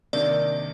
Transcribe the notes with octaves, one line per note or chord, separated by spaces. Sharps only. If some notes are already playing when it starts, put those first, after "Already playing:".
C3 D#3 A#3 D4 D5